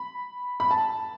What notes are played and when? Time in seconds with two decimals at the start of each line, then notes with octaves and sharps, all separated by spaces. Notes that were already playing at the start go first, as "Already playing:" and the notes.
Already playing: B5
0.60 B5
0.71 A5